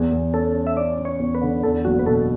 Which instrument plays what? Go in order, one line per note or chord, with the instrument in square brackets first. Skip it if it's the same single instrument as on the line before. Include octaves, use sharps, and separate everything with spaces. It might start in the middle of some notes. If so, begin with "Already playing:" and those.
Already playing: [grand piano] E2 [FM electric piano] G#4
[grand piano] E2
[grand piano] C#4 [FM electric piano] A4
[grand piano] C#4
[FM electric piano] E5
[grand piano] C#4 [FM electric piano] D5
[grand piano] C#4
[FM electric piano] C#5
[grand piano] E2
[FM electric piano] B4
[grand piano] D3
[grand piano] E2 [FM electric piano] A4
[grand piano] F#1 [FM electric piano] F#4
[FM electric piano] B4
[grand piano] B2 [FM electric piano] A4